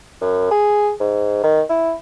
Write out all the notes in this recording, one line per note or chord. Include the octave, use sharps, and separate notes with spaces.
F#2
G#4
G#2
D#3
E4